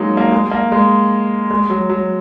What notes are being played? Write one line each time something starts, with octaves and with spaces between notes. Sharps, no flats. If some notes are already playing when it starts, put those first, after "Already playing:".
Already playing: F#3 G#3 A#3 C#4 D#4
A#3
G#3
A#3
G#3
G#3
F#3
F#3